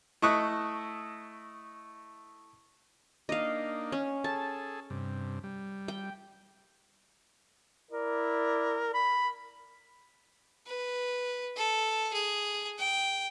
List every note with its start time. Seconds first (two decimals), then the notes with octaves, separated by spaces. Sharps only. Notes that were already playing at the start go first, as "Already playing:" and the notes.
0.22 A3 E4 D#5 C#6 F#6
3.29 A#3 D4 D#4 D#5 F5
3.92 C#4
4.24 G#4 A4 A5
4.90 G2 C3
5.44 G3
5.88 G5
7.91 E4 A#4 D5
8.94 B5
10.66 B4
11.56 A4
12.13 G#4
12.79 G5